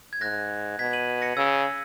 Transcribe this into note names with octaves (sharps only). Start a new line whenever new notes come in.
G#6
G#2 F#6 A#6
B2 G#6 B6
D#7 F#7
A#6 C#7
C#3 E6 G#6